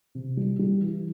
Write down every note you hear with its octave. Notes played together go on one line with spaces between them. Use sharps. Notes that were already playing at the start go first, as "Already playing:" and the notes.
C3
G3
G3
E3